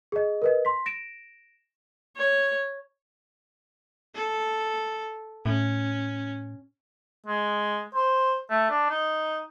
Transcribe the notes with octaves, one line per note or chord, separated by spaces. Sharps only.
G#4 D#5
A#4 B4 D#5
C6 B6
A#6 D7 E7
C#5
A4
A2 C#4
G#3
C5
A3
D4
D#4